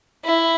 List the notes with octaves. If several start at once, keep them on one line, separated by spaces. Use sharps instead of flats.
E4